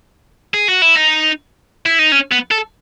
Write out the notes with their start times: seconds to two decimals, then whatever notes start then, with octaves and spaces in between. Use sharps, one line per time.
0.54 G#4
0.68 F#4
0.82 E4
0.96 D#4
1.86 E4
1.99 D#4
2.12 C#4
2.32 B3
2.51 A4